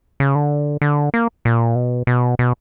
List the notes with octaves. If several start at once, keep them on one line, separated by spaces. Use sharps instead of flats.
C#3
D3
D3
A#3
A#2
B2
B2
B2